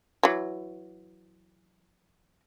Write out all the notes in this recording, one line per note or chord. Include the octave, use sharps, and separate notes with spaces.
E3 F#3